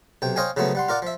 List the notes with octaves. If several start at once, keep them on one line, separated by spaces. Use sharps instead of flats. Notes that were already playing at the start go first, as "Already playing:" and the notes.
B1 C3 G5
C5 C#5 D#5 F5 G5 G#5
C#3 F3 F#3 A3 B3
G3 F#5 C6
F4 A#4 D5 F#5
F3 E5